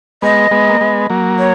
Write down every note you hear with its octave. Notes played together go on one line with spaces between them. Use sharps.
G#3 B3 D#5
G#3 B3
A#3
G#3 B3
F#3 A#3
C#5